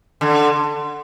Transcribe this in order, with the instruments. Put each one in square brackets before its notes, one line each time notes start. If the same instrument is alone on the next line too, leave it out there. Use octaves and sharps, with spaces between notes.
[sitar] D3